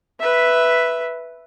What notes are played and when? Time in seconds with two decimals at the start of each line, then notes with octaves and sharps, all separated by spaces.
0.19 B4 E5